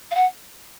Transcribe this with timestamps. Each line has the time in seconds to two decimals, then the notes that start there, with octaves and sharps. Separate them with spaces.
0.10 F5
0.14 F#5